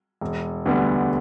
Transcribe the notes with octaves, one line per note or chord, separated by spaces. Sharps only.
E1
D2 D3 G3 B3